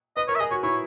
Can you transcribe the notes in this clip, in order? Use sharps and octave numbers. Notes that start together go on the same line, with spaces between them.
B4 D#5
A#4 C#5
E5
G#4 D#5
F#4 C#5
E4 C#5